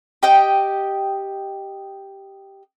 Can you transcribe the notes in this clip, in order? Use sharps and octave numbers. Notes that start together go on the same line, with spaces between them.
G4 D#5 G5